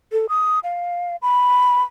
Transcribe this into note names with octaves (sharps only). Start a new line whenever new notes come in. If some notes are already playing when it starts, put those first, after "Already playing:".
A4
D#6
F5
B5